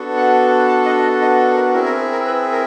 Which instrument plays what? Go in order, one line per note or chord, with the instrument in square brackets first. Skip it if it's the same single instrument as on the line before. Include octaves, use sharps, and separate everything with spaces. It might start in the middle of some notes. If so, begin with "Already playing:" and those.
Already playing: [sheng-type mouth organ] B3 D4 F#4 A4
F#5
A5
D#5
D#5
D#5
A4
A#4
C4 E4 G#4 A#4
A#4
A#4
B4
A#4